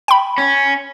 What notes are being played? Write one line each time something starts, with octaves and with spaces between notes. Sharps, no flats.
G5 B5
C#4